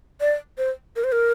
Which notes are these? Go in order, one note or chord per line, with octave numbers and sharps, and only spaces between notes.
D5
C5
A#4
C5
A#4